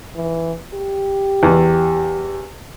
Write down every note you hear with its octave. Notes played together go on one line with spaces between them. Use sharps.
E3
G4
E2